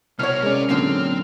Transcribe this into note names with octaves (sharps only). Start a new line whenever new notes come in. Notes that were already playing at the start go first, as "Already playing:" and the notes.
C2 B2 C#5 F6
G#3 C#4 A#4 D5
F#2 A#2 D3 C4